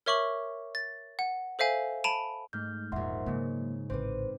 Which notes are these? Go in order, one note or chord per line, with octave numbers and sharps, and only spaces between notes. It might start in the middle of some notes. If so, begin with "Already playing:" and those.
A#4 C#5 E5 C#6 D6 F#7
A6
F#5
A4 C5 E5 F5 G#5
A5 B5 D7 D#7 F7
G#2 A3 F6 G6
E1 A#1 E2 G#2 E5 F#5 C6
G#2 C#3 F#3 A#3
A1 D3 C4 B4 C5 D6 D#7